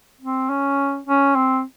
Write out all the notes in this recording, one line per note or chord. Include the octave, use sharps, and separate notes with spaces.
C4
C#4
C#4
C4